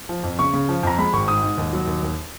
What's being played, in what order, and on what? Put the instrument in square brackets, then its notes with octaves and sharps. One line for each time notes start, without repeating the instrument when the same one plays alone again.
[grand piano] F3
F2
C#3 C#6
C#3
F3
F2 A#5
G#3 B5
G#1 C#6
G#2 D#6
G#2
D#2
F#3
D#2
D#2